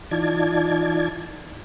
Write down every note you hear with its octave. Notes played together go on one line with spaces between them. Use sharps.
E3 D#4 F4 D5 A5 G#6